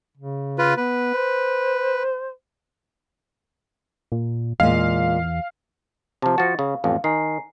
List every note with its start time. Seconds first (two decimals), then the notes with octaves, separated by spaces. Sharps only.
0.17 C#3
0.58 F4 B4
0.77 B3 B4
1.14 C5
4.12 A#2
4.60 E2 A#2 G#3 F5
6.22 C3 F3 A5
6.38 F3 F#4 A6 A#6 C#7
6.59 C#3 F5
6.84 A1 F2 F5
7.04 D#3 G#5 A#5 C7